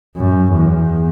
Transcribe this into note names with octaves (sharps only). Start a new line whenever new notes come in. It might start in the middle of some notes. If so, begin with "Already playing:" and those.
F#2
E2